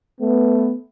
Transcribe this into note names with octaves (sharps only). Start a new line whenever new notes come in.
A3 B3